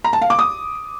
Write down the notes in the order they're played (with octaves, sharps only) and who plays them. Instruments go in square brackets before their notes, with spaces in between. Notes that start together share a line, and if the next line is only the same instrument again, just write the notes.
[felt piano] A#5
A5
F5
D6
D#6